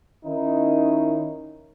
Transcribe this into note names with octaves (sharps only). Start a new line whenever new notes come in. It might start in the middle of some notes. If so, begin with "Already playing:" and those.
D#3 C#4 D#4 E4